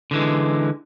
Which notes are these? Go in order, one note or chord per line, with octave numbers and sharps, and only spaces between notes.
D3 E3 G#3